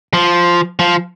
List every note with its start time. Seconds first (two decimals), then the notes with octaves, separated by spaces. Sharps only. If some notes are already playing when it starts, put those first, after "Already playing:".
0.14 F3
0.79 F3